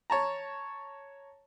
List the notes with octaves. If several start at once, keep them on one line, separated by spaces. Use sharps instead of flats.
C#5 A5 A#5